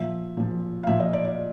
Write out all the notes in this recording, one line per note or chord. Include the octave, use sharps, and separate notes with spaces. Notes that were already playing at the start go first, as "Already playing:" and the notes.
Already playing: A#2 F3 E5
A#2 F3
F5
A#2 F3 E5
D#5
D5
D5